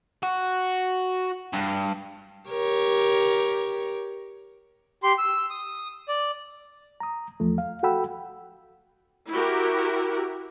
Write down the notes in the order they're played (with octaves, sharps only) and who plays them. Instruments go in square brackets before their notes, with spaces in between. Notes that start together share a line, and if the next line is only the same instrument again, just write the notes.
[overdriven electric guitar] F#4
G2
[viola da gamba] G4 A#4 C#5
[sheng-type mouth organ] G4 C6
E6
D#6
D5
[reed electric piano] A#5 D#6
E2 F3 A3
F5
F#4 A4 F#5 G5 B5 E6
[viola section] E4 F#4 G4 A#4